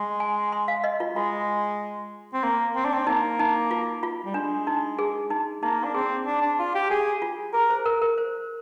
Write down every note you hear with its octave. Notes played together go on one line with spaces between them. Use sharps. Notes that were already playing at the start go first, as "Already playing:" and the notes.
Already playing: G#3
G#5
C6
F5
D#5
F4
G#3 F4
C4
A#3
C4
D4
C4
A#3 D#4
D#4
F4
F4
G3
G#3 D4
D#4
G#4
D#4
A#3 D#4
D4
C4 G#4
D4
D4
F4
G4
G4 G#4
F4
G#4 A#4
C5
A#4
A#4
C5